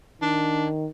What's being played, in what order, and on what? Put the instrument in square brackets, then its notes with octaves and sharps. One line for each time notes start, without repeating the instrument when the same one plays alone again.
[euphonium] D#3 [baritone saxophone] D4